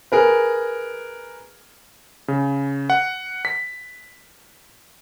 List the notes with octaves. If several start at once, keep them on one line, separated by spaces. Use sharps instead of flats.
G#4 A#4 B4
C#3
F#5
B6